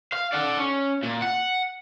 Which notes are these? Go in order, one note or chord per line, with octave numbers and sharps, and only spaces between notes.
F5
D5 F#5
C#4
A#2
F#5